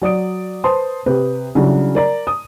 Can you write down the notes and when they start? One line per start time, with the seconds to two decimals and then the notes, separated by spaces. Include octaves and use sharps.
0.02 F#3 D5 D#6 D7
0.64 B4 C5 A5 C6 D#6
1.06 C3 G4 B4
1.55 C#3 F#3 G3 D4 E4
1.95 A#4 D5 A#5
2.27 D#6